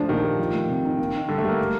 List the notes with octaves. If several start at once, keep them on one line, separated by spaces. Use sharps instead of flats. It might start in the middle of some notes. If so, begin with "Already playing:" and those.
Already playing: F3 A3 D4
A#2 D#3
G4
F3
A3
C3
D#4
A#3
D#4
D3 G3
A3
G3
A#3
A3